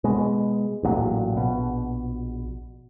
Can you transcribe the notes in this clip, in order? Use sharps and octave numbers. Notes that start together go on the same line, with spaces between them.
B2 G#3
A1 G2 A#2 F#3
A#1 B2